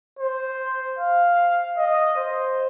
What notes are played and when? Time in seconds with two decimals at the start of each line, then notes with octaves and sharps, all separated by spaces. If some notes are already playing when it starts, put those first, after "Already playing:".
0.19 C5
0.99 F5
1.78 D#5
2.17 C5